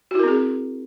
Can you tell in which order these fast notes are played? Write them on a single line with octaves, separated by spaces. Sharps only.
F#4 E4 A#4 C4 G#4